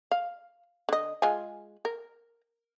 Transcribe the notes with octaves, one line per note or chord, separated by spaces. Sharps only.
F5
D3 D#5
G#3 F4 G#5
A#4